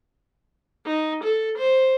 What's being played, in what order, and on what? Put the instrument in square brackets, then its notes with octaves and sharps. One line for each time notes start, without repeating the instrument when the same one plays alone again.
[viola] D#4
A4
C5